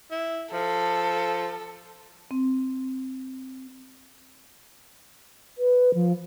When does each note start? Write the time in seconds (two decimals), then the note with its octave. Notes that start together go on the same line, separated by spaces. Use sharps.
0.11 E4
0.53 F3 A4
2.31 C4
5.58 B4
5.94 F3